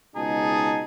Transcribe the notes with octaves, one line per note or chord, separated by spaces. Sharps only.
C#2 B2 D#4 G#4 A5